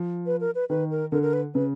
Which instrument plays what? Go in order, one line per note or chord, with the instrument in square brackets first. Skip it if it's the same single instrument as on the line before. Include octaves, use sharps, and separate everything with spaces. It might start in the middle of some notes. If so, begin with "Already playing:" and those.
Already playing: [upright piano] F3
[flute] B4
A#4
B4
[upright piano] D#3 [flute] B4
[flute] A#4
[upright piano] D3 [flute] A#4
[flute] A#4
B4
[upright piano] C#3 [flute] B4